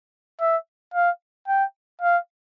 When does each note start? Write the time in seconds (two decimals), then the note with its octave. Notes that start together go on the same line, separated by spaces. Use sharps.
0.40 E5
0.94 F5
1.48 G5
2.02 F5